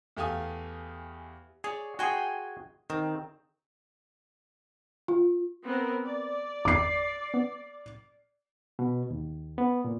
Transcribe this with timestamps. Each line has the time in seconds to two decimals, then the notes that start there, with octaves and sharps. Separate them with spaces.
0.17 E2 A3 G4 F5 G#5 D#6
1.64 G#4 C#5 D5
1.99 F#4 G#4 G5 G#5 C6
2.90 D#3 C4
5.08 F4
5.65 B3 C4 A#4
6.05 D5
6.65 G1 E2 D6 G6 C7
7.34 B3
8.79 B2
9.10 D#2
9.58 B3
9.84 A#2